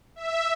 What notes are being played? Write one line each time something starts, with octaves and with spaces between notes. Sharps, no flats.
E5